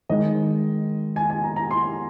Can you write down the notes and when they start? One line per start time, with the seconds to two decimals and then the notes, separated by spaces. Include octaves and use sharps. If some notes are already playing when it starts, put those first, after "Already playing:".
0.09 D#3 G#3 D#4 D#5
1.16 G#5
1.30 G#5
1.44 A#5
1.56 A#5
1.71 C6